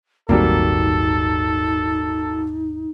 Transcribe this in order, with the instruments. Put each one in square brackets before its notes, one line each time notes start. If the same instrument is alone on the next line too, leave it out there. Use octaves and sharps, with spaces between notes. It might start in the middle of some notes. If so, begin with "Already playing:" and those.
[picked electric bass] D#1 G#1 C4 [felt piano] F#3 G3 A#3 [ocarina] D#4 [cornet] A4